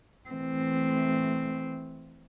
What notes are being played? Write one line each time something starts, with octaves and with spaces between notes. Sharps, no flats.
E3 A3 C4